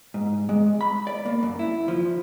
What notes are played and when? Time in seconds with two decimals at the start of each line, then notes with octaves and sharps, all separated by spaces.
0.14 G#2
0.49 G#3
0.81 B5
1.07 D5
1.26 A#3
1.43 F#2
1.59 E4
1.88 F3